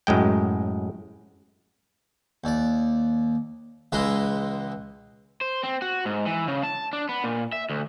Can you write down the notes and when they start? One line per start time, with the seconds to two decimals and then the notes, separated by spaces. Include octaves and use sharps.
0.07 F#2 A2 G#3 G5
2.44 D#2 D5
3.92 C#2 E3 G#3 B4 A#5 C6
5.41 C5
5.64 C4
5.82 F#4
6.05 G#2
6.26 E3
6.48 C#3
6.63 A5
6.93 D4
7.09 B3
7.24 A#2
7.52 E5
7.70 D2